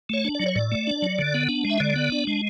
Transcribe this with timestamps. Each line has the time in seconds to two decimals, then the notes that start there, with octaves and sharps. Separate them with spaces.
0.09 A3 C#5
0.24 D4
0.35 F#3 D5
0.46 C#5
0.55 A2 D5
0.72 A3
0.87 D4
1.02 F#3
1.19 D3
1.34 B3
1.49 D4
1.65 G#3
1.70 E5
1.80 D3 D5
1.96 B3
2.12 D4
2.27 G#3